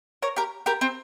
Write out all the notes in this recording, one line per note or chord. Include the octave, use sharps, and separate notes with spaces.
A#4 C#5
G4 A#4
G4 A#4
C4